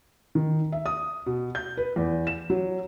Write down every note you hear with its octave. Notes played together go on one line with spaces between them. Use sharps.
D#3
E5
D#6
B2
G6
B4
E2
E7
F#3